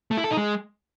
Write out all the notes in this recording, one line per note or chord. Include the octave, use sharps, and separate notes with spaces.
A3
E4
A4
D#4
G#3